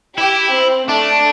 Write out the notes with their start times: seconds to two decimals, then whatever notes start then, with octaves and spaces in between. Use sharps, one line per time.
0.18 E4 G4
0.53 C4
0.88 A3 D4